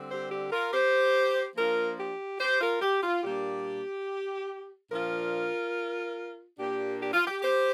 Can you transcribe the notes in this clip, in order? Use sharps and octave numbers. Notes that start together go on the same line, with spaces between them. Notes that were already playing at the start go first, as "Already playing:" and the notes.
Already playing: D3 G3 C4
G4 C5
G4
F4 A#4
G4 C5
F3 A#3 D4 F4 A#4
G4
G4 C5
F4 A#4
G4
F4
A#2 G3 A#3 D4 G4
A#2 F3 D4 F4 A#4
A#2 A#3 D4 G4
G4
F4
G4
G4 C5